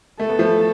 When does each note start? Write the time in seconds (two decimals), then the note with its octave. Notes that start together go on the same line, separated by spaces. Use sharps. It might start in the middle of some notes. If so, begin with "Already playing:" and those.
0.20 A3 A4
0.29 B3
0.39 F3 A3